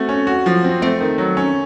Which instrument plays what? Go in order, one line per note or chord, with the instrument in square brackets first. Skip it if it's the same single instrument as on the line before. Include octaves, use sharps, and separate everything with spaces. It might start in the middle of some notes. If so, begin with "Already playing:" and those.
Already playing: [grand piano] A3 F#4 [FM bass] C4
[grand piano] C#4
F#4
F3
C4
[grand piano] A3 [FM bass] C4
[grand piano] D#3
F#3
C#4